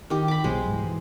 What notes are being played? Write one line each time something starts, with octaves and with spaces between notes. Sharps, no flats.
D#3 G4
B5 D6
C2 B2 F#3 G#3 C5
G#2 E3
E3